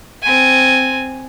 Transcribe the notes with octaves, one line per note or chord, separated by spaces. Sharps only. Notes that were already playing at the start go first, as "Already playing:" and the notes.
C4 G#5